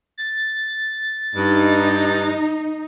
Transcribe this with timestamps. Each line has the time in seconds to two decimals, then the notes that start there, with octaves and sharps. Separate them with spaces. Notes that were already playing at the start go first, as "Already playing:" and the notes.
0.18 A6
1.36 G2 D#4